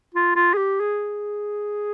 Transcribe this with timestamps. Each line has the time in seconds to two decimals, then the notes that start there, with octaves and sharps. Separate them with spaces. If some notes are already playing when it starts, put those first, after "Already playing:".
0.14 F4
0.36 F4
0.53 G#4
0.57 G4
0.80 G#4